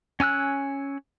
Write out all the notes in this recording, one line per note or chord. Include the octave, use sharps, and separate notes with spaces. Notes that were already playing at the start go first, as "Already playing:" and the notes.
C#4 G#5 E6 F#6